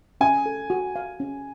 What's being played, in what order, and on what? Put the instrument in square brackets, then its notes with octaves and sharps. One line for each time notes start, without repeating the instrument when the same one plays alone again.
[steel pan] C#4 [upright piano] G#5
[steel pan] A4
F#4
F5
C#4